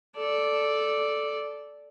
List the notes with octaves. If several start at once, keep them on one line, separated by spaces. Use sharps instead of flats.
A4 D5